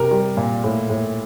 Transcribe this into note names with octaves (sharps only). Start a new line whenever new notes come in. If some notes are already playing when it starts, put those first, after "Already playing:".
Already playing: C3 A#4 A#5
G3
A#2
A2
A2